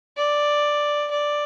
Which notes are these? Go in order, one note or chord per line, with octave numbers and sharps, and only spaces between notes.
D5
D5